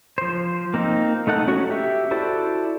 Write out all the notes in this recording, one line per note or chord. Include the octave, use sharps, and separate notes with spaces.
F3 C5
A#3 C4 D#4
A3 D#4 A4 F#5
C#4 F#4 C#6
G4 E5
E4 F#4 A4 C5 D5